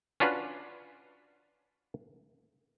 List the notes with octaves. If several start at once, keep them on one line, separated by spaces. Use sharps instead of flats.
C#4 D4 F4 F#4 B4